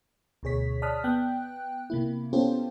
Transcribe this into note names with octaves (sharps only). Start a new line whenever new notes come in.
D2 B2 G#4 C#5 B6
D5 A5 D#6 F6 F#6 B6
B3 G5 F#6
C3 A#3 E4
B3 C#4 F4 G4 A4 C5